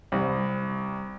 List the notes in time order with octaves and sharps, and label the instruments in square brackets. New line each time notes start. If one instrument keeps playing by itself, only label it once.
[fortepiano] C2